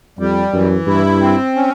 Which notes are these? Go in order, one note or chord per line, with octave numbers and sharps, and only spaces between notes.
F2 G3
F#2 E3
G2 E4
C4
C#4